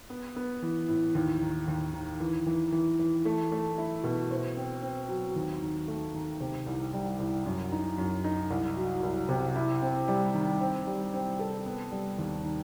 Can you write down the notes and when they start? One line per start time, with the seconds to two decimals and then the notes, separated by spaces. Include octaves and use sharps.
0.10 B3
0.36 B3
0.62 E3
0.88 A2
1.15 D#2
1.41 D#3
1.68 D#2
1.94 D#3
2.20 E3
2.47 E3
2.72 E3
2.99 E3
3.25 A3
3.52 A3
3.78 E4
4.04 B2
4.31 C5
4.56 C4
4.83 C4
5.09 F#3
5.36 D#2
5.62 D#3
5.88 A3
6.14 D#3
6.40 C3
6.66 C2
6.93 G3
7.19 C2
7.46 F#2
7.72 D#4
7.98 F#2
8.24 D#4
8.50 C2
8.77 F#3
9.03 C2
9.29 C3
9.55 E4
9.82 C4
10.08 G3
10.34 D#3
10.61 C4
10.87 G3
11.14 C4
11.39 A4
11.66 B3
11.92 G3
12.18 D#2
12.44 D#3